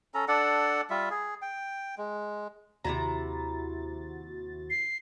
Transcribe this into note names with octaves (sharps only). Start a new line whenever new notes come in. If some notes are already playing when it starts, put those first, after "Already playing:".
C#4 A4 A#5
D4 A4 D5 F#5
G3 F4 E5
G#4
G5
G#3
D#2 C3 E4 F#4 A#5 A6
C7